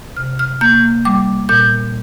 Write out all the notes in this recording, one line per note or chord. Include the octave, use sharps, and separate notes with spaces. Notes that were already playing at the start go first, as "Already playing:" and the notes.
C3 F6
F6
A#3 G6
G3 D6
A#2 G6